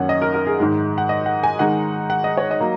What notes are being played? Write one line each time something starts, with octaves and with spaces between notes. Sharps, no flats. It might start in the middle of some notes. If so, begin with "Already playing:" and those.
Already playing: F#2 D#3 A#3 C#4 C#5 F#5
D#5
A#4
A#4
G#4
G#2 D#3 G#3
F#5
D#5
F#5
G#5
D#3 G#3 D#4 F#5
F#5
D#5
C#5
D#5
F#3 A#3